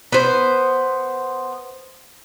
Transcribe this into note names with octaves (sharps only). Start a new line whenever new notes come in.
B3 C5